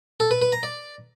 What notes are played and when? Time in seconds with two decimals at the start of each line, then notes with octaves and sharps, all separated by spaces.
0.20 A4
0.31 B4
0.42 B4
0.52 A#5
0.63 D5